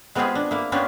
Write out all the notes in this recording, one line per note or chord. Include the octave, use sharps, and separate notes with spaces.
G#3 B3 C4 F4 G4 G#4
D4
A#3 E4
A#3 B3 C#4 D4 F4 G4